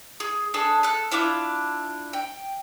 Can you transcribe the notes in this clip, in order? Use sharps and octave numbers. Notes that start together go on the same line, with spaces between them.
G#4
D4 G#4 A4
A4 F#6
D4 E4 F4 D6
G5